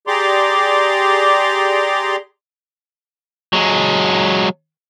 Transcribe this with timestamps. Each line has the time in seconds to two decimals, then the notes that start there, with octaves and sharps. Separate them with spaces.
0.07 G4 G#4 D5 A#5 C6 D6
3.53 F#3 G#3